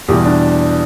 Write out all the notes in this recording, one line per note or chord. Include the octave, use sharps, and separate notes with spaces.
E2 B2 G3 G4
D4